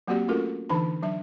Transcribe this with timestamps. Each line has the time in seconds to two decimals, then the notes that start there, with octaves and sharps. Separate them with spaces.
0.08 F#3 A#3 C4 F#4 G4 D5
0.28 A3 C#4 F4 F#4 A4 A#4
0.69 D3 E3 D4 D#4 B5
1.03 F#3 D4 E5